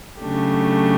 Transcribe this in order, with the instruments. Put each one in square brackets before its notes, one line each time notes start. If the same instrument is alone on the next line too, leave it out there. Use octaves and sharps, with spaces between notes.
[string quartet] C#3 F#3 A3 D4 G4